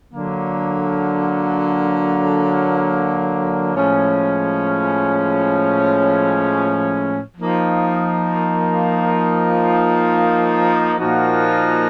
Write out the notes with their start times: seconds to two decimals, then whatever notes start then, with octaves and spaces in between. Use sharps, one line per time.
0.12 D3 F#3 A#3
3.75 A2 F3 G#3 C#4
7.37 F3 A#3 D#4
10.99 A#2 F3 A#3 D#4 F#4